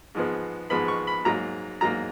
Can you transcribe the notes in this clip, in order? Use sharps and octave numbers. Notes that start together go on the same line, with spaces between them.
G#2 F3 G#3 B3
G#2 F3 G#3 B3 B5
C#6
B5
G#2 F#3 A#3 A#5
G#2 F#3 A#3 A#5